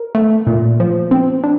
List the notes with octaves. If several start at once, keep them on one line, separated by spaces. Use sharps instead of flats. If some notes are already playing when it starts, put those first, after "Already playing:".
Already playing: A#4
A3
A#2
F3
C4
D4